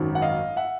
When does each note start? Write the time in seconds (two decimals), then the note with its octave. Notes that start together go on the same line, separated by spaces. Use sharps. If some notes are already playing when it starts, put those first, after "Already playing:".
Already playing: G#1 F#2 D#3
0.15 F#5
0.22 D#5 F5
0.56 E5 F#5